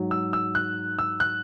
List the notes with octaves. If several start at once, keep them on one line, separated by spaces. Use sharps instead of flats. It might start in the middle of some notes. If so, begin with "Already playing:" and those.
Already playing: G#2 F#3
E6
E6
F#6
E6
F#6